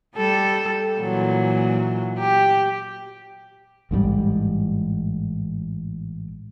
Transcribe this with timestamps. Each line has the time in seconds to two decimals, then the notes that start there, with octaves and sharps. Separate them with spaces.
0.16 G3 A4
1.01 A#2 E3 F#3
2.19 G4
3.91 A1 G#2 B2 G3